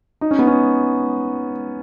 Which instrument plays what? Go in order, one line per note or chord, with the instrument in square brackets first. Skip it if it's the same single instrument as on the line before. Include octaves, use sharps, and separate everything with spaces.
[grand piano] D#4
C#4
B3
C#4